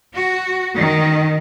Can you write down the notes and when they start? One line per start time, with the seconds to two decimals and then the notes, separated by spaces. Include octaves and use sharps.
0.15 F#4
0.78 D#3